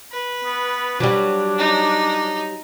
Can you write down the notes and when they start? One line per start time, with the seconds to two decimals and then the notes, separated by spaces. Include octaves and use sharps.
0.12 B4
0.44 B3
1.00 F#3 G3 D4
1.58 D#4